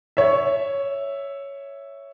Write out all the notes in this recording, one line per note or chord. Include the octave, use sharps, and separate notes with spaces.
C#5 E5